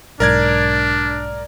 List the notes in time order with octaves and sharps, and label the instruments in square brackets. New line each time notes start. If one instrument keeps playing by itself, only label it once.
[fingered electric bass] B1 G#2 [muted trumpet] D4 [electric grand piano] A#4 D5 G#6